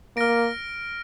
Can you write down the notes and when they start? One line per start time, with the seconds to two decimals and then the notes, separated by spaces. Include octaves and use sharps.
0.17 A#3 F6 A#6 D7